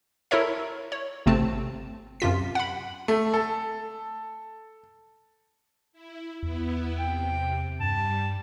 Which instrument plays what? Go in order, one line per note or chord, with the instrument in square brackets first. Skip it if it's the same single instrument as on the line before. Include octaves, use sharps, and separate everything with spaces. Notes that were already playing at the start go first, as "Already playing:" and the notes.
[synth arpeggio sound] E4 A4 A#4 C#5 E5
C#5
G#1 C3 A3 C4 A5
F#2 C3 F4 B6
F#5 B5
[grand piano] A3
A4
[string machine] E4
[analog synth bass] E2 [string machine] B3 E4
[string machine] C3 [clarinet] G5
[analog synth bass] G2 [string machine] G3 [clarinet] A5